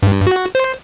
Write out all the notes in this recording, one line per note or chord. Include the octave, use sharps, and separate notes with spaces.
G2
F#4
C5